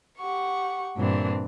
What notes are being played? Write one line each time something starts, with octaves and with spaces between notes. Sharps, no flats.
G4 F#5 C#6
G2 A#2 E3 C4 D4